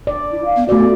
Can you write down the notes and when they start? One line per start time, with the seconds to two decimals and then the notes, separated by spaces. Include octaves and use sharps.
0.07 D5
0.31 E4
0.45 F5
0.57 B3
0.69 A3 B3 F#4 D5